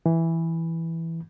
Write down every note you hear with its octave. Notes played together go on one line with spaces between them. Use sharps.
E3